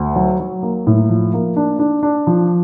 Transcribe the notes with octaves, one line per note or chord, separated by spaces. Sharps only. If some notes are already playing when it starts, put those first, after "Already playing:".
Already playing: D2
F#3
F#3
A#3
A2
F3
A#3
D4
D4
D4
F3